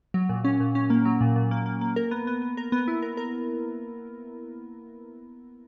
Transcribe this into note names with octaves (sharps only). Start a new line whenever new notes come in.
F#3
A#2
C#4
A#2
C#4
A#3
F#3
A#2
A#2
A#3
A#3
A#3
A#4
B3
B3
B3
A#4
B3
E4
A#4
A#4